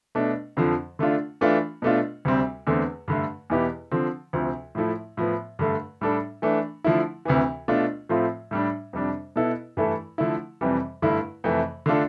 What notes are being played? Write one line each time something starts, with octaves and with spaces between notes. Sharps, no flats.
B2 A3 D4
F2 D3 F3
D3 A3 D4 F4
E3 A3 D4 F4
B2 A3 D4 F4
D2 C3 G3 C4
E2 D3 A3 C4
G2 D3 A3
E2 B2 B3 E4 G4
D3 F3 C4
D2 C3 F3 C4
A2 F3 A3 E4
A2 F3 B3
G2 D3 A3
A2 G3 D4 A4
E3 A3 D4
D3 F3 A3 E4
D2 C3 E3
B2 A3 D4 F4
A2 F3 A3 C4 F4
A2 G3 D4
F2 C3 G3 D4
B2 B3 E4 A4
G2 E3 A3 E4 A4
D3 F3 A3 E4
F2 C3 E3 G3
G2 D3 A3 E4
F2 C3 E3 A3
D3 A3 D4 F4 A4